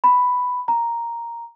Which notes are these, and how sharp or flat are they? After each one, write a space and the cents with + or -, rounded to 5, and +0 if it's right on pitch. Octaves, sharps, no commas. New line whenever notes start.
B5 +5
A#5 +0